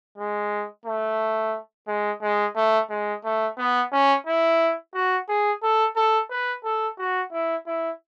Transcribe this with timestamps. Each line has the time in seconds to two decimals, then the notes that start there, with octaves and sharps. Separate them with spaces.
0.18 G#3
0.86 A3
1.88 G#3
2.22 G#3
2.56 A3
2.90 G#3
3.24 A3
3.58 B3
3.92 C#4
4.27 E4
4.94 F#4
5.28 G#4
5.62 A4
5.96 A4
6.30 B4
6.64 A4
6.98 F#4
7.32 E4
7.66 E4